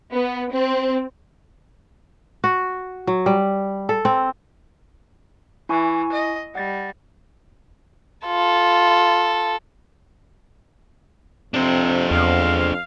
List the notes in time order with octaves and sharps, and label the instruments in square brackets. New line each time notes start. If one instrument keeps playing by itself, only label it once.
[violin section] B3
C4
[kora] F#4
F#3
G3
A4
C4
[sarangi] E3 [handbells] E4 G#5 C#6
[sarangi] D#5
[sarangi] G3 [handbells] F#5 A6 A#6
[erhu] F4 [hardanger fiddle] A4
[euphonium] F2 [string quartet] C3 [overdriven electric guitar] D4 C5
[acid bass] E2 [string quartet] F5